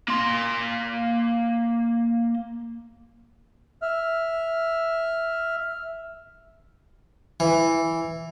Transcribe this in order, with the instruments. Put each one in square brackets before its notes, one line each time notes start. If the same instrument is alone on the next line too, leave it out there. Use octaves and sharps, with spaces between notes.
[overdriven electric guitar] A#3 C6
[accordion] E5 F6
[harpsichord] E3